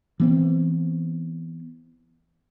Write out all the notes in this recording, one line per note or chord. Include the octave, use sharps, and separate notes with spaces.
E3 B3 C4